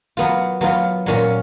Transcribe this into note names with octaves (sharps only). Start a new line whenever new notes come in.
F#3 B3 F4
F#3 B3 F4
A#2 F#3 C#4 F4